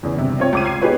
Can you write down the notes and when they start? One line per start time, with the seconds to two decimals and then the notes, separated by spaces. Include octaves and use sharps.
0.03 E2 C#3
0.16 G2 C3
0.38 C4 F4 C#5 G5
0.53 C#2 D6 D#7
0.65 G#6 C7 D#7
0.82 B3 D#4 G4 G#4 B4 C#5